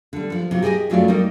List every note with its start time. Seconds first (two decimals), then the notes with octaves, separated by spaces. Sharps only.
0.13 D3 G3
0.32 F3
0.51 C3 F#3 F4
0.63 G4 G#4 A#4 D#5 G#5
0.90 F#2 F#3 A3 F4 D5
1.08 G3 A#3 D#4